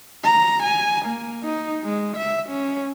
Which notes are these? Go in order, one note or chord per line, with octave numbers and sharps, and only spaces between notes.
A#5
G#5
A#3
D#4
G#3
E5
C#4